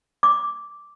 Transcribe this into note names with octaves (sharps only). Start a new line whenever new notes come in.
D6